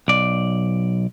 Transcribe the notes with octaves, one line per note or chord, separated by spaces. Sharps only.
B1 D5